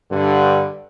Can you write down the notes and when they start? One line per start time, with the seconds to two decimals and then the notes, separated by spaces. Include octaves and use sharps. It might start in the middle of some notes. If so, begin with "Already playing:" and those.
0.12 G2 D3